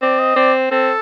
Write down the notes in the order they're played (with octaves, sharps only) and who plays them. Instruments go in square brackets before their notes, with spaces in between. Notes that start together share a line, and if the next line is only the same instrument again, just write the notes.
[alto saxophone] C4 [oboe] D5
[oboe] D#5
[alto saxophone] C4 [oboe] D5
[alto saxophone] C4 [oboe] A4